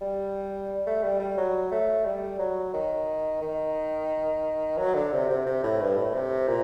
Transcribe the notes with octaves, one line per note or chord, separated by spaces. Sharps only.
G3
A3
G3
G3
F#3
A3
G3
F#3
D#3
D#3
F#3
D3
C3
C3
C3
A2
G2
A2
C3
A#2